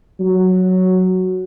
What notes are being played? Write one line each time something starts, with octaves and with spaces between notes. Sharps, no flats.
F#3